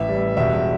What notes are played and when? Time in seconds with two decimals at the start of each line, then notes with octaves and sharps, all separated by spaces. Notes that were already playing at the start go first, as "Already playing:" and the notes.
Already playing: A1 E5
0.09 G3
0.37 E1 E5